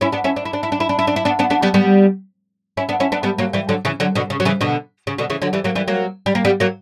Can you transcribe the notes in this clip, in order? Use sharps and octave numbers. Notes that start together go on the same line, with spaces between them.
C#4 E4
B3 D4
C#4 E4
D4
E4
D4
E4
D4
E4
D4
E4
D4
E4
B3 D4
B3 D4
B3 D4
G3 B3
G3 B3
C#4 E4
B3 D4
C#4 E4
B3 D4
G3 B3
F#3 A#3
E3 G3
D3 F#3
C#3 E3
D3 F#3
B2 D3
C#3
F#3
C#3 E3
B2 D3
C#3
B2 D3
C#3 E3
D3 F#3
E3 G3
F#3 A#3
E3 G3
F#3 A#3
G3
A#3
G3 B3
F#3 A#3